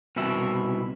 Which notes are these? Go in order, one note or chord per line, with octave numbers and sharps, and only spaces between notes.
C2 B2 E4 E5